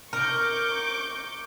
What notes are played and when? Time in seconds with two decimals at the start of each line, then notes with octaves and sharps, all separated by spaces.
0.13 A#4 C#6 D6 G6